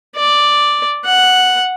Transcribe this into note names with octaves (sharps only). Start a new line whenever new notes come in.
D5
F#5